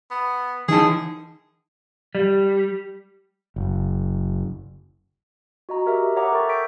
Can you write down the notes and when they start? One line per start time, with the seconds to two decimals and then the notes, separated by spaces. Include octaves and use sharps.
0.11 B3
0.68 E3 D#4 G#4 A5
2.15 G3
3.56 F#1
5.69 F#4 D#5 A#5
5.86 G4 A#4 E5 A#5
6.16 C#5 E5 F#5 A#5 D6 D#6
6.32 A4 A#4 G5 C#6 A6
6.49 C#6 G6 A6 B6 D7